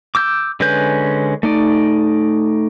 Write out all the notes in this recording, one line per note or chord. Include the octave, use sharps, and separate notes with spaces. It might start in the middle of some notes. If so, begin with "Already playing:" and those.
D6 E6 G6
D3 G#3 C#4 B4 G6
A3 D#4 D5